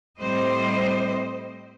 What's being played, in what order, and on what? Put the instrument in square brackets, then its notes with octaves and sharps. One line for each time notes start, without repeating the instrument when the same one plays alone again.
[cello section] A2 G3 C4 C5 D#5